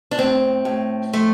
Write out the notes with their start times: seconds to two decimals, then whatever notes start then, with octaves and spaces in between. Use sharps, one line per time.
0.11 D4
0.18 A2 C4
0.65 A2
1.13 F3 A3